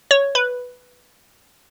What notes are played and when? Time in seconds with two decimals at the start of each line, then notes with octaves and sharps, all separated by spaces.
0.11 C#5
0.35 B4